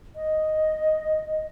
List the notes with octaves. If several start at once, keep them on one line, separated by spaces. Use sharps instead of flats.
D#5